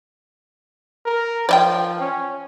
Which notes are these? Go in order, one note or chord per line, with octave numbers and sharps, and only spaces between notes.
A#4
F3 D5 D#5 G5
C#4